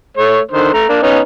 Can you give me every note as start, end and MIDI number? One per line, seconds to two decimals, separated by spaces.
0.17 0.40 57
0.17 0.40 73
0.51 0.72 50
0.51 0.72 51
0.51 0.72 72
0.73 0.87 57
0.73 0.87 82
0.89 0.98 58
0.89 0.98 62
1.02 1.20 59
1.02 1.20 61
1.02 1.20 63